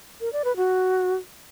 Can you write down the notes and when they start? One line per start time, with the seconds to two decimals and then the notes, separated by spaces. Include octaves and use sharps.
0.21 A#4
0.33 D5
0.45 B4
0.56 F#4